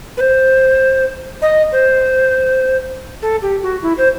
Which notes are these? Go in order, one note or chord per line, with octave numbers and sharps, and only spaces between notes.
B4
C5
D#5
C5
A4
G4
F#4
E4
C5